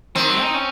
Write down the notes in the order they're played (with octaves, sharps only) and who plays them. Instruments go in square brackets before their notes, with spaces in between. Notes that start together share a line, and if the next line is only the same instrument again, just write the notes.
[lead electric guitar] D#3 [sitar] C4
[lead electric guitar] F#3
D#4
C#4